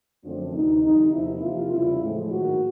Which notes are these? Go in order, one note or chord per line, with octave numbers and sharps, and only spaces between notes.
F#2 D3 F3 A3 C4 D4
D2 C3 E3 D#4
F2 D3 G3 D#4
E2 C3 F3 A#3 E4
C3 F3 A#3 F4
E2 C#3 E3 G3 E4
A2 F3 G#3
G#2 D#3 F#3 A#3 F#4